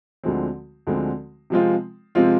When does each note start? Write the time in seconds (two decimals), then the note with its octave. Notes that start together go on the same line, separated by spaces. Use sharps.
0.23 D2 D3 F3 G#3 C4
0.87 D2 D3 F3 G#3 C4
1.50 C3 F3 G#3 C4 F4
2.15 C3 F3 G#3 C4 F4